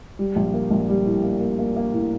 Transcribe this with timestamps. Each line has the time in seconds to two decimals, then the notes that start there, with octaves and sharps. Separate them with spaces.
0.19 G3
0.36 A#1
0.54 A#3
0.71 A#1
0.89 G3
1.06 A2
1.24 A#3
1.41 A#3
1.59 A#3
1.76 A#3
1.93 A2